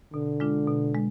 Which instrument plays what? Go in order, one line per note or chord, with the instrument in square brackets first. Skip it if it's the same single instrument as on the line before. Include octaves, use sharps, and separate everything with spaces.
[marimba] B2 [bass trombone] D3
[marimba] G#3 D4 F4
B2
G#3